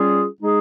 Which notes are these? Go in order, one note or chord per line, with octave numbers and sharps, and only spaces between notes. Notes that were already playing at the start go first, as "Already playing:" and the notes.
Already playing: G3 C#4 F4 G#4
G#3 D#4 G#4